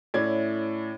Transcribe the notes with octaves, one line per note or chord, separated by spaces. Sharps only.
A2 C#4 E4 D5 G#6